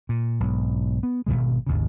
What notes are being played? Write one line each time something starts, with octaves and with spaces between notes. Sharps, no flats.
A#2
B1 G#2
B3
G#1 E2 B2 G#3
G#1 D#2 C#3